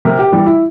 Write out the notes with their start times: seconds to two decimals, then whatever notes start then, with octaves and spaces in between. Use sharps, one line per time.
0.05 C3 A#4
0.19 G4
0.32 E3 G3
0.46 E4